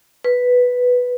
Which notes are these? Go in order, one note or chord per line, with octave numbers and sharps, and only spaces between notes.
B4